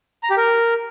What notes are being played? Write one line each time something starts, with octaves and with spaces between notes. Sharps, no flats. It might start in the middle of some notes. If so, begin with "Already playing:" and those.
A#5
G4
A#4